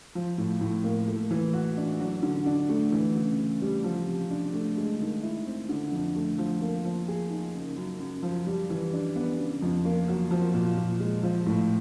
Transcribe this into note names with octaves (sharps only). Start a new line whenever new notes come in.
F3
A2
A2
A#3
A3
E3
F#4
D4
F#3
D3
D4
A3
E3
C#3
C#3
G3
F3
C3
D4
A3
G#3
D#3
E4
C4
D3
F2
A3
F3
A#3
F3
G#4
D#4
C#3
F#2
F#2
F3
G3
E3
D4
B3
C#3
F2
A#3
F#3
F3
A#2
A#2
G#3
F3
A2